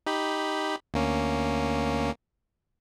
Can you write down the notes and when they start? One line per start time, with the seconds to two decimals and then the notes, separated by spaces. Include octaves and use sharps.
0.06 D#4 G4 B5
0.94 D2 A#3 C#4